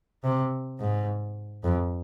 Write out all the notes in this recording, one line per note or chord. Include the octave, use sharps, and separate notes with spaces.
C3
G#2
F2